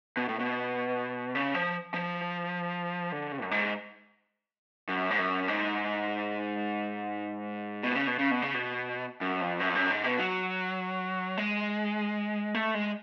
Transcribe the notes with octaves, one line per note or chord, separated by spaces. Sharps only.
B2
A2
B2
C#3
F3
F3
D3
C#3
F#2
G#2
F#2
G#2
F#2
G#2
B2
C#3
B2
C#3
B2
C#3
B2
F#2
F2
F#2
F2
F#2
G#2
B2
F#3
G#3
A3
G#3